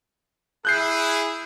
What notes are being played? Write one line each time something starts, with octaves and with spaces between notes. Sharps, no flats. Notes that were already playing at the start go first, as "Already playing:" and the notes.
E4 G#4 F#6 G6 C7